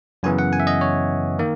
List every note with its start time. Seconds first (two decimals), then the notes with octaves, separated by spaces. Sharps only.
0.23 F#2 C#3 E3 B3 G#5
0.39 F#5
0.53 G#5
0.60 E5
0.67 D#5
0.81 C#5
1.39 D#3 A#3